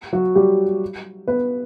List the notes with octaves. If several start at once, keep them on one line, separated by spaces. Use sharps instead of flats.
F#3 F#4
G3 G4
B3 B4